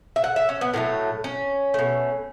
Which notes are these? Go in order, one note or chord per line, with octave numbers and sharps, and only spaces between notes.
E5
F#5
E5
C#4
B3
A2 F#3 A3 B3
C#4
B2 A3